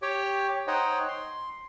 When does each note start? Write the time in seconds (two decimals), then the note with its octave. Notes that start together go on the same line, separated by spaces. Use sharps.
0.02 G4 C#5 G5
0.67 D#4 C5 C#5 D#5 F#5 G5
1.08 C6